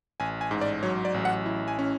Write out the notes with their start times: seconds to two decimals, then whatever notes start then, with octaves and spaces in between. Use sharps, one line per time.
0.20 A1 G#5
0.41 G#5
0.51 G#2
0.61 D5
0.83 F#3 C#5
1.05 D5
1.14 A1
1.25 F#5
1.46 E4
1.68 G#5
1.79 C#4